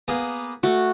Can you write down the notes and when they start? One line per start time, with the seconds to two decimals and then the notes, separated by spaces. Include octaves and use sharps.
0.08 A#3 B3 G#4
0.63 A3 F#4